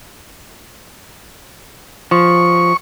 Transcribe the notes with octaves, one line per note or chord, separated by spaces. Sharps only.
F3 C#6